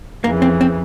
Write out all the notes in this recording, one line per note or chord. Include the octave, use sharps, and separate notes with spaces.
F2 C#3 E3 A#3
C4
C4